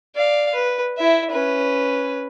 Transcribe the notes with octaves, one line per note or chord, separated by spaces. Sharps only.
D5 F5
B4
E4 E5
C#4 B4